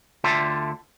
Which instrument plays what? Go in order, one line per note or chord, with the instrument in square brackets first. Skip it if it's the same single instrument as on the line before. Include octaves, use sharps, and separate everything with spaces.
[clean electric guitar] D2 D3 F4 A4 E5 G5